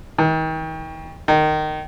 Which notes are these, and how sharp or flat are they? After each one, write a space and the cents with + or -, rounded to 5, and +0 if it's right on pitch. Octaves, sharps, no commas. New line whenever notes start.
D#3 +40
D#3 -15